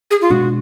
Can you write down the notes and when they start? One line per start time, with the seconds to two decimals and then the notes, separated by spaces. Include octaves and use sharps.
0.11 G#4
0.21 F4
0.30 B2 G#3 D4 F#4